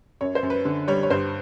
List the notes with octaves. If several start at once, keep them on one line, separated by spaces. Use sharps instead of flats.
F#2 C#5
C5
F#2
B4
D3
G3 C#5
C#5
G2 C5